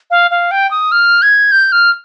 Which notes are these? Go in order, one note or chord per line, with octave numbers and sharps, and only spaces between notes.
F5
F5
G5
D#6
F6
G#6
G6
F6